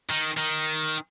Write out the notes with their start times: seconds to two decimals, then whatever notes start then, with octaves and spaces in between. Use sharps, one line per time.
0.09 D#3
0.37 D#3